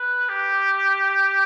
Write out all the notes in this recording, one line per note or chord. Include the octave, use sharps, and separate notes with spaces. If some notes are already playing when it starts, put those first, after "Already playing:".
Already playing: B4
G4